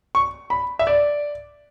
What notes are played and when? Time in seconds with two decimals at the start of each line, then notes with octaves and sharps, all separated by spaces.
0.15 C#6
0.50 B5
0.79 E5
0.87 D5